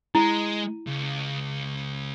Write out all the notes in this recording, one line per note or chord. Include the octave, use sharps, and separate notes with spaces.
G#3 E4
C#2